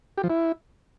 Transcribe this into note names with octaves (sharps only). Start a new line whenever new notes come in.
G4
F3
E4